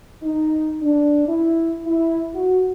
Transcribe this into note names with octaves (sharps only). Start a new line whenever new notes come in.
D#4
D4
E4
E4
F#4